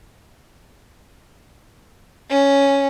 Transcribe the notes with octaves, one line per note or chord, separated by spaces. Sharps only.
C#4